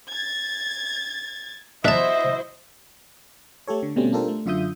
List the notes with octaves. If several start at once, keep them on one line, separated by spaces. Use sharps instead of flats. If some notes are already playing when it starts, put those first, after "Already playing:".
G#6 A6
D4 E4 F#4 C5 D#5 E5 A5
A3 G4 A4 C#5
D3
B2 G3 A3 C4 C#4
D4 F4 G4 A4 A#4 C5
A3
F#2 D3 F4 E5 D#6 G6